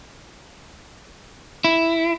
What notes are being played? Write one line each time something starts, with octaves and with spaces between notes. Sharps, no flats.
E4